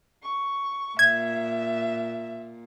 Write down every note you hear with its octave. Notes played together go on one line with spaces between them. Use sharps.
C#6
A#2 E5 G#6